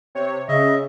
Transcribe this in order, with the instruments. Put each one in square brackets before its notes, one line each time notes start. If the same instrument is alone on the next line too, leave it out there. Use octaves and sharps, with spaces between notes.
[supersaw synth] C3 C#5
[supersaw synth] C#3 [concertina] D#5 E5